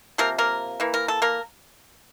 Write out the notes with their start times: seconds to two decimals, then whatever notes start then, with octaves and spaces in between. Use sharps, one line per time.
0.18 C3 F3 A#3 A#4
0.38 A#3 A#4
0.80 E3 A#3
0.94 A#4
1.08 A4
1.22 A#3 A#4